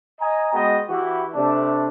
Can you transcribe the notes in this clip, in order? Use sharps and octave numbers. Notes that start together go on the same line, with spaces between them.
D#5 G#5 A#5
G#3 B3 F#4 D#5 G5
E3 E4 F#4 G4
C3 A3 D4